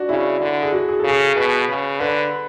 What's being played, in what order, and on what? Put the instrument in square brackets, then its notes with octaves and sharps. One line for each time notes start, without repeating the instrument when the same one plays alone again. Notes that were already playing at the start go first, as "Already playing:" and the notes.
Already playing: [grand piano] D4 F#4
[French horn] C#3 [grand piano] E4
[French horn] D3
[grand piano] G#4
F#4
G#4
A4
[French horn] C#3 [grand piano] G#4
[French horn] B2 [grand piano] B4
[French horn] C#3
[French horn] D3 [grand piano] B4